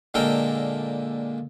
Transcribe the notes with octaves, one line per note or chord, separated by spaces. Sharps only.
A#2 D3 G#3 A4 A#4 G5